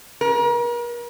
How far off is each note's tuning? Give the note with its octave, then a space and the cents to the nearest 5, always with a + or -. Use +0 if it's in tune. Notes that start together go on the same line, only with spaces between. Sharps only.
A#4 +40